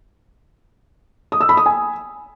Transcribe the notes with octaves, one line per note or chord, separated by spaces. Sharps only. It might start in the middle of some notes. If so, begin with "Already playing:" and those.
D#6
E6
B5
D#6
G#5